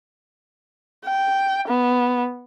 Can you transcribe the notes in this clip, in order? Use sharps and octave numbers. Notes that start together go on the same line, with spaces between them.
G5
B3